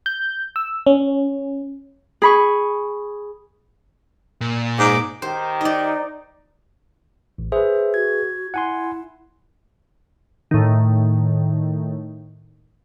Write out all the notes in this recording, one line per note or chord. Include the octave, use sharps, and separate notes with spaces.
G6
E6
C#4
G#4 B5 C#6
A#2
G#2 D6
D#3 G4 C5
D#4 D5 D#5
A1
G#4 B4 C5 E5
F#4 G#6
E4 F#5 G#5 C6
A2 D#3